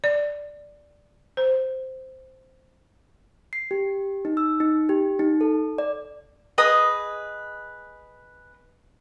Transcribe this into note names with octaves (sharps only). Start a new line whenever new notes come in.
D5
C5
C7
G4
D#4
E6
D#4
G4
D#4
A4
D5
G#4 B4 D#5 D#6